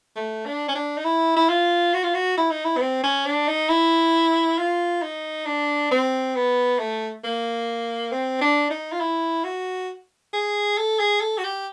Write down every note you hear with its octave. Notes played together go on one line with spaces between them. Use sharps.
A3
D4
C#4
D4
D#4
E4
E4
F4
F#4
F4
F#4
E4
D#4
E4
B3
C4
C#4
D4
D#4
E4
F4
D#4
D4
C4
B3
A3
A#3
C4
D4
D#4
F4
E4
F#4
G#4
A4
G#4
A4
F#4
G4